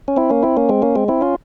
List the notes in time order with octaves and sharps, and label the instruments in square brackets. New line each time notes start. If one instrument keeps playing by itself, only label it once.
[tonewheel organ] C#4
C4 E4
A#3 C#4
C4 E4
A#3 C#4
G#3 C4
A#3 C#4
G#3 C4
C4 E4
C#4 F4